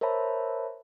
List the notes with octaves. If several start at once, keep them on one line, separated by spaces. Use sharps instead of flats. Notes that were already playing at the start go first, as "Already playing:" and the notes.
A#4 C5 C#5 E5 A5 B5